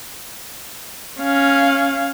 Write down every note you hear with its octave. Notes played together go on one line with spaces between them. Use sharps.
C#4 F5